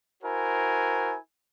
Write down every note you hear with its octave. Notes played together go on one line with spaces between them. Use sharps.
E4 F#4 A#4 C5 G#5